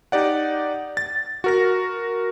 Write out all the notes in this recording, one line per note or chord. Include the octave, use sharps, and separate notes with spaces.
D#4 G4 D5 F#5
A6
F#4 A#4 A#6